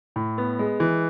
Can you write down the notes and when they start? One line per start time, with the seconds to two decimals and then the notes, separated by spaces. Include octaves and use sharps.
0.16 A2
0.38 B3
0.59 G#3
0.80 E3